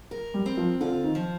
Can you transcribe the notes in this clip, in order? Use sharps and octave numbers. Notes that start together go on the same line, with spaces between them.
A#4
G3
C4
F3
D3 F4
D#3
F3